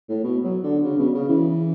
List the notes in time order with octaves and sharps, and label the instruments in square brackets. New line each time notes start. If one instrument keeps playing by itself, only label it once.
[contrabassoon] A2
B2
F#3
D3
C#3
B2
C#3
E3